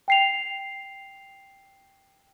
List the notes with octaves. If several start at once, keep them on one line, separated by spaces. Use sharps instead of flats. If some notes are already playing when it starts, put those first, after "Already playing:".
G5 C7 F7